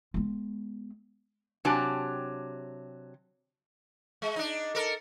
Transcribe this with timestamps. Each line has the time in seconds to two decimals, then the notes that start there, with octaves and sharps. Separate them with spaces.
0.14 G#3 B3
1.65 C3 F#3 D4 G4 G#5 A5
4.22 G#3
4.36 D4 D#4
4.75 A4 A#4